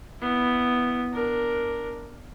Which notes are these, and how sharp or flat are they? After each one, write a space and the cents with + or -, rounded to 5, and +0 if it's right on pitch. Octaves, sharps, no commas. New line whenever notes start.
B3 +0 E4 +0
D4 +0 A#4 +5